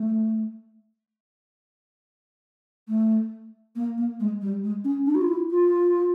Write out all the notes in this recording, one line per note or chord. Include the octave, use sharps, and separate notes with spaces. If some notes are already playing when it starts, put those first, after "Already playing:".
Already playing: A3
A3
A#3
A#3
G#3
G3
G#3
C#4
D4
F#4
F4
E4
F4